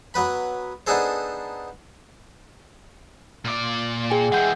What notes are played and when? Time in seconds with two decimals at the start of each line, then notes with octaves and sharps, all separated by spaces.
0.14 F#3 B3 B4 B5
0.87 B3 D4 D#4 G#4 A4 C5
3.45 A#2 D5
4.10 G#4 G5 G#5
4.32 E3 G#3 F#5 G6